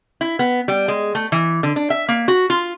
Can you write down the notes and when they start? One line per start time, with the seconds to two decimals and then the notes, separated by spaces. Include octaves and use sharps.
0.21 E4
0.39 B3
0.68 G3
0.88 G#3
1.15 A3
1.32 E3
1.63 D3
1.76 D4
1.90 E5
2.08 A#3
2.28 F#4
2.50 F4